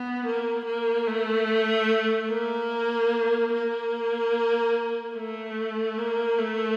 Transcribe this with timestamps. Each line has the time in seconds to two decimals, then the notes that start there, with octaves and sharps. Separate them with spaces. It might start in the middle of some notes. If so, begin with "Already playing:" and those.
Already playing: B3
0.26 A#3
0.66 A#3
1.07 A3
2.30 A#3
3.53 A#3
5.16 A3
5.98 A#3
6.39 A3